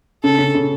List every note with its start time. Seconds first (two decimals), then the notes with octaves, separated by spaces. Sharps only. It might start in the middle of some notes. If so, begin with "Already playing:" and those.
0.24 C#3 A4
0.38 C#3
0.55 C#3